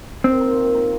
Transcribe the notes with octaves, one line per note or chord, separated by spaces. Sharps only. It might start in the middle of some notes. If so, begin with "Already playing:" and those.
D#3 C4
A#3 F4 A#4
D#3
A#3 F4 A#4